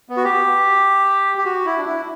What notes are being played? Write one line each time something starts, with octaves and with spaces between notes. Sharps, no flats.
B3
F#4
G4
G4
F#4
E4
D4
E4